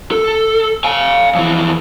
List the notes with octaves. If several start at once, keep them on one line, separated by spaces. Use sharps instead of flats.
A4
F5 G#5
F2 E3